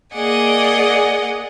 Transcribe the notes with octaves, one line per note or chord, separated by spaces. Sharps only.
A#3 G#4 D5 D#5 F#5 G#5